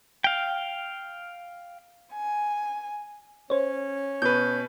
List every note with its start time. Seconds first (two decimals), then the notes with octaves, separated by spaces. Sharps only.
0.24 F5 G5
2.12 G#5
3.50 C#4 C5 C#5
4.22 B2 B4 G6